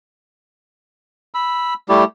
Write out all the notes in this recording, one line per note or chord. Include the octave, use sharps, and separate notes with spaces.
B5 E6
G3 A3 E4 G4